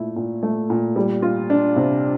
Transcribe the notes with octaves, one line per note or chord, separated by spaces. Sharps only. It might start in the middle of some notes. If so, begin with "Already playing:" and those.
Already playing: A#2 A3 E4
A#2
A3
A#2
G3
F4
D4
C3